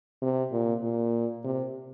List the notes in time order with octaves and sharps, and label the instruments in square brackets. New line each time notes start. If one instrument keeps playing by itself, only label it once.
[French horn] C3
A#2
A#2
C3